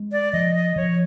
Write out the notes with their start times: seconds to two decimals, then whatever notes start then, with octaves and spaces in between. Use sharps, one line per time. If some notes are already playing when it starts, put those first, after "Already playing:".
Already playing: G#3
0.12 D5
0.33 F3 D#5
0.56 D#5
0.76 F3 C#5